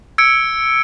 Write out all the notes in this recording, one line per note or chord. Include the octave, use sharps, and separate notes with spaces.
E6 G#6 C#7 D7